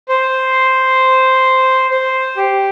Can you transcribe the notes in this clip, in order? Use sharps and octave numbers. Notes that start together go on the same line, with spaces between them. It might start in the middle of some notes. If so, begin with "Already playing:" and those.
C5
C5
G4